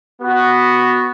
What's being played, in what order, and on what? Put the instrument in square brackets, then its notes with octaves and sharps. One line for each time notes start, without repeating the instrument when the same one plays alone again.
[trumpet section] B3 F#4